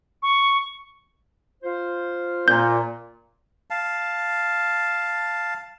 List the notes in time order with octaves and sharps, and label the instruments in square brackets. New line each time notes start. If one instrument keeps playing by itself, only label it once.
[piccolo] C#6
[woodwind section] F4 C5
[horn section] A#2 [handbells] G6
[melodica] F5 A5